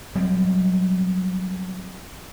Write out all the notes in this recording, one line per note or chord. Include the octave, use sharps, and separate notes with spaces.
F#3 G3 C4